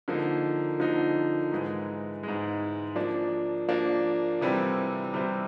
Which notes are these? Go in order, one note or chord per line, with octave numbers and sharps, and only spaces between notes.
D3 F3 A#3 D#4
D3 F3 A#3 D#4
G#2 E3 G#3
G#2 E3 G#3
F3 A#3 D4
F3 A#3 D4
C3 E3 G3 C4
C3 E3 G3 C4